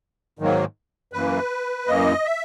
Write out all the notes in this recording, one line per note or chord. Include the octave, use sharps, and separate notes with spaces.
G#2 D#3 F#3 A#3
F#2 E3 A#3 B4
F#2 E3 A#3 D#5
E5